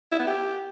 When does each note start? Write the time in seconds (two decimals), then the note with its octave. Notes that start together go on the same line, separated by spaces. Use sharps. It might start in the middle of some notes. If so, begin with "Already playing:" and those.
0.12 E4
0.19 B3
0.27 G4